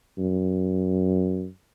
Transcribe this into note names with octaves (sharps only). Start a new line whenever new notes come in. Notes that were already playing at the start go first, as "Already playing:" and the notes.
F#2